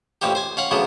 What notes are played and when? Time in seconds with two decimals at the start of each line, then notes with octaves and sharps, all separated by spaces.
0.22 A1 F2 C4 C#4 G4
0.35 C5 G#5
0.57 C#4 F5 F#5
0.71 D2 C#3 F3 F#3 B3